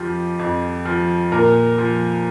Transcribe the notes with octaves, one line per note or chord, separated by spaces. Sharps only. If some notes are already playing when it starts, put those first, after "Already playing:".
Already playing: F2 F3 G4
F2
F3
A#2 A#4
F3